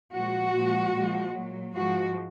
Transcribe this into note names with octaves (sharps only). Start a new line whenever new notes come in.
A#2 F3 G#3 F#4
A#2 F3 G#3
A#2 F3 G#3
A#2 F#3
G#2 F3 G#3 F#4